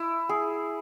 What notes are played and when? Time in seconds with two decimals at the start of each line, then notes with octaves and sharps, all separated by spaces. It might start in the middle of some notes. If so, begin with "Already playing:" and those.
Already playing: E4
0.29 G#4